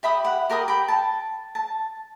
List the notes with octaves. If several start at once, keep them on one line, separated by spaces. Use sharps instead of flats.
G4 E5 B5 D#6
F#5
G4 A#4 B5 D#6
G5 B5
A5
A5